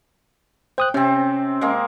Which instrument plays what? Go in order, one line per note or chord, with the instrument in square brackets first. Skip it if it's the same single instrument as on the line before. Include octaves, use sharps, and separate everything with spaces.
[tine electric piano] C5 D#6 F#6 [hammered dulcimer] G5
[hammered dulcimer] C3 C4 [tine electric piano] C#4
[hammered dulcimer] G#3 A#3